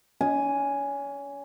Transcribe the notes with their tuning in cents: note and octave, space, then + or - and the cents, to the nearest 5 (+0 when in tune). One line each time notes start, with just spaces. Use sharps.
C#4 +35 G#5 +0